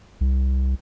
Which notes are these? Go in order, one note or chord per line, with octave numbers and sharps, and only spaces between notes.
C2